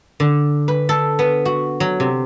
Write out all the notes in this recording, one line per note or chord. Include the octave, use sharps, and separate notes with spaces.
D3
B4
A4
B3
F#4
F#3
C3